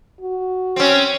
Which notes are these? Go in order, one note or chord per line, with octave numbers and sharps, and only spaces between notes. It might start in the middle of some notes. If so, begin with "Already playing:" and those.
F#4
C4 C#4